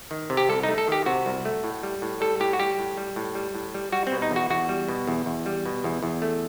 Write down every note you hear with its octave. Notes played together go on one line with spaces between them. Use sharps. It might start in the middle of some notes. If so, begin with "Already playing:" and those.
D#3
C3
G4
C2 A4
D#4
A3
A4
D#3 G4
C3 F#4
C2
A3
A2
G3
A2
G3 A4
A2 G4
F#4
G3 G4
A2
G3
A2
G3
A2
G3
G3 F#4
C4
B2
D#4
E2
F#4
E2 F#4
G3
B2
E2
E2
G3
B2
E2
E2
A3